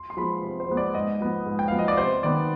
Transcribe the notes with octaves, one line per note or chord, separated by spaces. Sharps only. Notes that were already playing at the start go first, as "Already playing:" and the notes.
Already playing: C6
C6
F3 G#3 B3 B5
C3
C5
F3 G#3 B3
D5
G#2 D#5
F3 B3
G#2
G5
F3 B3 F5
D#5
D5
C3 C5
D#3 B3 D5